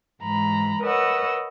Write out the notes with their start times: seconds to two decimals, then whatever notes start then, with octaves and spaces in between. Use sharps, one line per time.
0.22 G#2 E3 A#5 B5
0.82 A#4 B4 C#5 D#5 F#5 E6